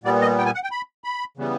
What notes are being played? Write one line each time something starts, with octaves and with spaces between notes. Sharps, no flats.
A#2 G3 B3 D5
D#5
G5
G#5
F#5
G5
B5
B5
C#3 E3 G3 B3